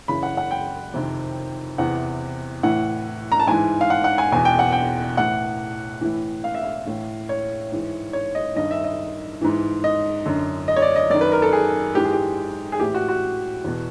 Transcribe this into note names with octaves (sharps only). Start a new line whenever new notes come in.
F#2 C#3 E3 B5
F#5
F#5
G5
F2 C3 D#3
E2 C3 E3 F#5
A2 E3 F#5
A#5
A5
G#2 E3 G#5
F5
F#5
F#5
G#5
E2 B2 G#5
G5
F#5
G5
A2 E3 F#5
A2 E3
F5
E5
F5
A2 E3
C#5
G#2 E3
C#5
D#5
G2 D#3 D#5
E5
D#5
G#2 E3
D#5
F#2 D3
D#5
C#5
D5
D#5
F#2 D#3 D5
B4
A#4
A4
G#4
G#2 E3 G4
G#4
G4
G#4
A2 E3 G4
F#4
F#4
E2 B2